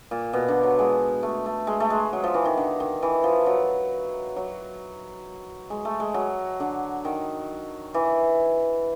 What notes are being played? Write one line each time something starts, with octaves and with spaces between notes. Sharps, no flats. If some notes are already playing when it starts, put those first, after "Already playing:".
A#2
B2
D3
F#3
G#3
A3
A3
G#3
A3
G#3
F#3
F3
E3
D#3
D3
D#3
E3
F3
F#3
F#3
G#3
A3
G#3
F#3
D3
D#3
E3